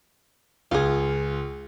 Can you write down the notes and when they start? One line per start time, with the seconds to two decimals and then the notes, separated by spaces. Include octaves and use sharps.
0.71 C#2 F4 G#4